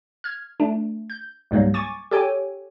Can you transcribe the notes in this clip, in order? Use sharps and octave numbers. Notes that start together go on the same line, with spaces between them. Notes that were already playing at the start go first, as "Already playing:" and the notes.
F6 G#6
A3 D4
G6
C#2 G#2 F#3 G3 A#3
G#5 C#6 D6 A6
G4 A4 C#5 G5 G#5